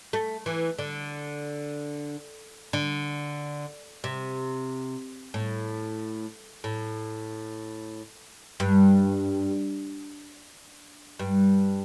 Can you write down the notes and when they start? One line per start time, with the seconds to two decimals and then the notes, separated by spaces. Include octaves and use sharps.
0.13 A3
0.46 E3
0.79 D3
2.73 D3
4.04 C3
5.34 A2
6.64 A2
8.60 G2
11.19 G2